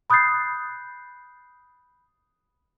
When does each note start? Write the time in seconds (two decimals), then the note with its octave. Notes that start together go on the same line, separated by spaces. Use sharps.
0.10 B5 D#6 F#6 G6 A6 C7